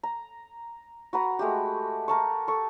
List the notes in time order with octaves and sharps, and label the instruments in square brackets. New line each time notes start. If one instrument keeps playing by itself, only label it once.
[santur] A#5
F#4 B4 A#5
G#3 A3 F#4 G4
A#4 A5 C#6
A4 C#6